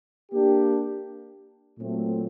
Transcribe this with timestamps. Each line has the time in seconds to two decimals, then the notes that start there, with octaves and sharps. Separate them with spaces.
0.32 A#3 D4 G4
1.76 A#2 F#3 A3 C4